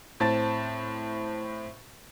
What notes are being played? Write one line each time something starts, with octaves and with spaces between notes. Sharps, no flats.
A2 C4 A5 A6